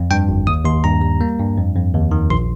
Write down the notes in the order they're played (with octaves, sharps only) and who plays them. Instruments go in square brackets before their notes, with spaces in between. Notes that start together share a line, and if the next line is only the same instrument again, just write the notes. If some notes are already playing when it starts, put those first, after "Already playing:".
Already playing: [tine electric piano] F2
G2 G5
G1
D#2 D#6
D#2 C6
G2 A#5
G3
A#3
G2
F2
F2
D#2
D#3
A#1 C6